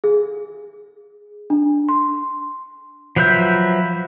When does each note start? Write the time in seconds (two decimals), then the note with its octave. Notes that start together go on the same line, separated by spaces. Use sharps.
0.04 G#4
1.50 D4
1.89 C6
3.16 F3 F#3 B4 E5 G6